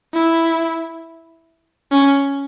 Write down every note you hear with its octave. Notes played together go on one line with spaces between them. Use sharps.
E4
C#4